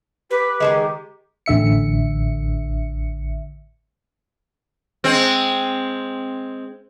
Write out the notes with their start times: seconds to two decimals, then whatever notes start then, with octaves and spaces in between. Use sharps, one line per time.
0.30 G4 B4
0.60 D#3 F3 G#3
1.46 A1 D3 E5 C#7
5.04 G#3 C4